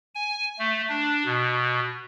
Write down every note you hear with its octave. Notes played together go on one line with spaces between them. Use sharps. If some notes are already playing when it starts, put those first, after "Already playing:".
G#5
A3
D4
B2